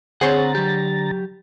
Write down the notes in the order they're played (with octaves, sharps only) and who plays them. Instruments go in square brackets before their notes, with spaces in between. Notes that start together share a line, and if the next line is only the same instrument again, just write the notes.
[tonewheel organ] D3 A#5 A6 [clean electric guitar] C4 F#5 [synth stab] G#4 C5 C#5
[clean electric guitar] F#3 G4